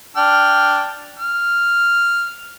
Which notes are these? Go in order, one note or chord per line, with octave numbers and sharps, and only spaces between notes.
D4 G5 F6
F6